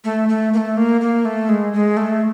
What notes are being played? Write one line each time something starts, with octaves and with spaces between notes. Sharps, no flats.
A3
A3
A#3
A3
A#3
A#3
A3
G#3
G#3
A3